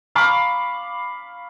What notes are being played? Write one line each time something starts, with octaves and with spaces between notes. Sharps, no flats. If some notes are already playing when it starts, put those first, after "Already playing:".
F5 B5 C#6 D6